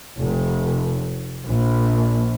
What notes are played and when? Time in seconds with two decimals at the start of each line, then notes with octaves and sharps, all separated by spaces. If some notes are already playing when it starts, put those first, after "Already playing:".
0.21 F1
1.45 A#1